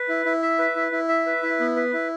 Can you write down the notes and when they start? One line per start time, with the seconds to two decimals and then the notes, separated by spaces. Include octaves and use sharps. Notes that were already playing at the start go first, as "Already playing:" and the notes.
Already playing: B4
0.09 E4
0.25 E4
0.42 E5
0.59 B4
0.76 E4
0.92 E4
1.09 E5
1.26 B4
1.43 E4
1.60 B3
1.76 B4
1.93 E4